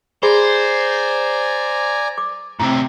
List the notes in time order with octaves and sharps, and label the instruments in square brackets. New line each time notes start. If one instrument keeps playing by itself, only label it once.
[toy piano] G#4 B5 [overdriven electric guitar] C5 [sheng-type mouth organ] D5 G#5 A#5
[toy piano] D6
[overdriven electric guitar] A2 C3 [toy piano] A#5